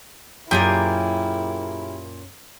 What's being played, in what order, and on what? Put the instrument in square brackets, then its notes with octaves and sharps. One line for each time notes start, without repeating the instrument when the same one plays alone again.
[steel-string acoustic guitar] F#2 C#5 F5 [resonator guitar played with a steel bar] A#2 [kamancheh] E4 [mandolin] G4 G#4 A#4